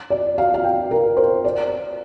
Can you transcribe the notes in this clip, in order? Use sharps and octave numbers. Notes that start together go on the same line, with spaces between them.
D5
F5
F5
G5
A#4
C5
D5